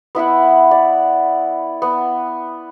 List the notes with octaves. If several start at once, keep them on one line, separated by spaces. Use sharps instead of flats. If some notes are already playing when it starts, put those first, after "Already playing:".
B3 E4 E5 F#5
D5
B3